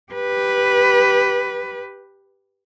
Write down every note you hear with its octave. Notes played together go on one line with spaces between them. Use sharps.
G4 B4